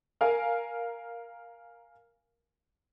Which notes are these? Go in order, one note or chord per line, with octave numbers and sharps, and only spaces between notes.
A#4 F5 G#5